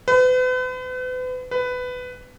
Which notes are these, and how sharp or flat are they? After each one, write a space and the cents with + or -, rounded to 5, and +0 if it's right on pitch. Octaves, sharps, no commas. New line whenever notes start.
B4 +40
B4 +15